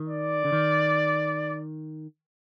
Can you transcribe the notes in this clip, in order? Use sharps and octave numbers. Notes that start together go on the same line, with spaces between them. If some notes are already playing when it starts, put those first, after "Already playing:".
Already playing: D#3
D5
D3
D#3